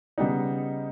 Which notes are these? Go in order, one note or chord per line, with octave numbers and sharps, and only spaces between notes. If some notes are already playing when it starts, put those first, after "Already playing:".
C#3 G3 B3 D#4